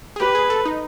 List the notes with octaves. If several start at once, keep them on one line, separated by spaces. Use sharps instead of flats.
G#4
G4 B4
G#4
A4
D#4